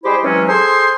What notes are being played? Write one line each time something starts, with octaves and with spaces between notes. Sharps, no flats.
G3 G#3 E4 G4 G#4 C5
C3 E3 F#3 G#3 C#4
G#4 A4 C5 G#5 C6